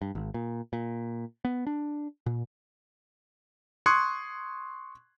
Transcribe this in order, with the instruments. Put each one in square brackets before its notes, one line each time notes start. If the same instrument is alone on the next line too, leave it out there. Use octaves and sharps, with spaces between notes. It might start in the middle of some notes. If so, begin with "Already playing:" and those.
[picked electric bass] G2
G#1
A#2
A#2
B3
D4
A#2
[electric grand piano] C6 C#6 D#6 F#6 G#6 C#7